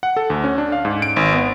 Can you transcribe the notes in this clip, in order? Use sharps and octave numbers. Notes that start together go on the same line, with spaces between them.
F#5
A4
D2
C#4
D4
F5
G#2
D7
G#1
B3